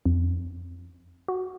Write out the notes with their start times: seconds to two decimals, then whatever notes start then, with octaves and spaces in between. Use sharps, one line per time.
0.06 F2
1.28 F#4